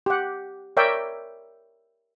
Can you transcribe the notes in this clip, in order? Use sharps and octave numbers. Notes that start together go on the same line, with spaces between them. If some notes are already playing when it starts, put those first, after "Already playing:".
G4 F#5
A#4 C#5 D5 E5 G5